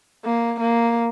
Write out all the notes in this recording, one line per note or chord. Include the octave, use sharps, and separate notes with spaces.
A#3
A#3